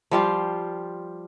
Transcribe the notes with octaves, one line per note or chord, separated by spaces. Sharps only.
F3 G3 F4